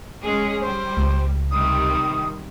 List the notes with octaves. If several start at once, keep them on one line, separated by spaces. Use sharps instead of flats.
G#3 C#4 G#4
G3 C5
C#2
C3 D#3 G3 D#6